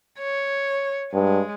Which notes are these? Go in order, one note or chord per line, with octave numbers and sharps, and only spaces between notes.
C#5
G2 G#3